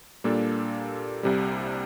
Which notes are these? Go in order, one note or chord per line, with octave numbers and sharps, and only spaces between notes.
A#2 G3 A#3 D4 A4
C2 C3 G3